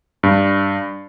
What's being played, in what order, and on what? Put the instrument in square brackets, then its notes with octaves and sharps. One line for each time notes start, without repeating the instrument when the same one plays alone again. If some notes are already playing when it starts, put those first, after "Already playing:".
[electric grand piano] G2